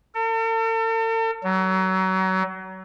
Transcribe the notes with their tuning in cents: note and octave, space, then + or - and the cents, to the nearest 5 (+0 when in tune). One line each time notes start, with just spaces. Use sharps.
A4 +45
F#3 +30